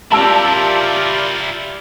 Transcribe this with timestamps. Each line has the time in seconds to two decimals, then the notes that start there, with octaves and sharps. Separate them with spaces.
0.12 E4 F4 G4 A#4 D5 A5 E6 D7